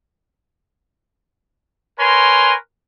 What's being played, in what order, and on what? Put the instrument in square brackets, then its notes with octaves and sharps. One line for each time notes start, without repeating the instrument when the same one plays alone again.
[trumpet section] A#4 B4 C#5 G#5 C6